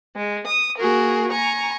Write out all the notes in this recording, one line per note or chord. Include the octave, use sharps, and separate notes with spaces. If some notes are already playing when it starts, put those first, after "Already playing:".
G#3
D#6
A#3 F#4 G#4 A#4
G#5 A#5 C#6